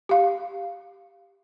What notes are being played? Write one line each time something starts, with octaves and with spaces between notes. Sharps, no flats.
G4 F5